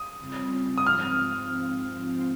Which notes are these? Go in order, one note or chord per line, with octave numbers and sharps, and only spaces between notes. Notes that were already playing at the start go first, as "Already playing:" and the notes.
Already playing: D#6
C#3 G3 C4 F4
D#6
G#2 F3 C4 F4 F6